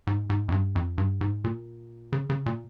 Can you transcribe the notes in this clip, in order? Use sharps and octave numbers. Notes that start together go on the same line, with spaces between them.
G#2
G#2
F2
G2
F2
G2
G#2
A#2
C#3
C#3
A#2